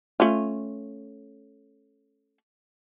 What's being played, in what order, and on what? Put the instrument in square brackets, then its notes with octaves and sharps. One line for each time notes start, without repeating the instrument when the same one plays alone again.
[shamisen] A3 C#4 F4